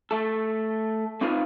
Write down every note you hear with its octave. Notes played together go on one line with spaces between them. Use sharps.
A3 A4
C4 D#4 F4 B4 C5 F5